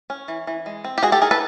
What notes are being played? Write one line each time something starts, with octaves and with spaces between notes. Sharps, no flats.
C#4
E3
E3
G#3
C4
G4
G#3 F#4 G#4
G4 A4
D#4 G#4 A#4
A4 B4